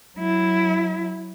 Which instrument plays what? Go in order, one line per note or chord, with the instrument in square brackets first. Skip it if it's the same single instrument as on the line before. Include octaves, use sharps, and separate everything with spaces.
[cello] F#3 E4